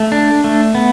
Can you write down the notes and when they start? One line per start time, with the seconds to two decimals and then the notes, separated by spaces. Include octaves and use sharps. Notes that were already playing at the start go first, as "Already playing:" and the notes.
Already playing: A3
0.12 D4
0.44 A3
0.75 B3